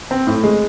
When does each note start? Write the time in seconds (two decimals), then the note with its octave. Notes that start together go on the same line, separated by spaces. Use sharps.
0.11 C4
0.27 A2
0.44 G#3